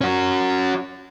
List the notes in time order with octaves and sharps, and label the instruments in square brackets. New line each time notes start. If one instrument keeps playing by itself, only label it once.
[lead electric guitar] C#4 F#4